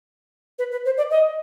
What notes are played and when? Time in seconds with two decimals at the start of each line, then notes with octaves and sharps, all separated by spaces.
0.58 B4
0.71 B4
0.85 C5
0.97 D5
1.10 D#5